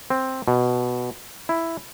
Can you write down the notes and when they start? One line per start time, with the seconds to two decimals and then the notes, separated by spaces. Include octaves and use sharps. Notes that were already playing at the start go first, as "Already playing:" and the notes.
0.10 C4
0.48 B2
1.49 E4